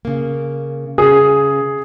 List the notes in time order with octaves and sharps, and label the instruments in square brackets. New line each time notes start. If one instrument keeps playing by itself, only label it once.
[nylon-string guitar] C#3 A#3
[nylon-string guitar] C#3 C#4 [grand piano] G#4